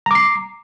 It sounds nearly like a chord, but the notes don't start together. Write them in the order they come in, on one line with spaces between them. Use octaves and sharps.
A#5 D6 C7